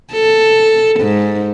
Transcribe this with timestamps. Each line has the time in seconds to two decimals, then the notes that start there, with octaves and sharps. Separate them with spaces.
0.12 A4
1.00 G#2